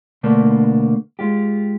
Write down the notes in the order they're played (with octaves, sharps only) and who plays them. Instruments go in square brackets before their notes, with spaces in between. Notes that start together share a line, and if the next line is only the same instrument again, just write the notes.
[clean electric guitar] B2 D3 A3 A#3 D4
G#3 F4 G4